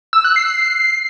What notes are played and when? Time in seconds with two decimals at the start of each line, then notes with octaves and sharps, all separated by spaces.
0.13 E6
0.24 F#6
0.36 C7